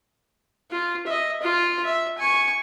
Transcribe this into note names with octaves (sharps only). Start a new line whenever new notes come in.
F4
D#5 E5
F4
E5
G#5 C#6